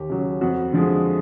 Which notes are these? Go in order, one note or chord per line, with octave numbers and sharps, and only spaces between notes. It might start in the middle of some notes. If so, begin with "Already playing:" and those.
Already playing: D#2 G4
C#3 F#3
F2 F#4
D3 F3 G#3